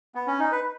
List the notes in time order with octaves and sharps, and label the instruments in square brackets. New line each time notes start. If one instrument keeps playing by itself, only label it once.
[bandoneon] B3
C#4
D#4
B4